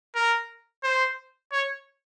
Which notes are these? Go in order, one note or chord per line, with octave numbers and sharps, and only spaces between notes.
A#4
C5
C#5